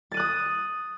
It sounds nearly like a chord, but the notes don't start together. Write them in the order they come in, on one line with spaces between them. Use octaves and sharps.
A6 D#7 F#6 D#6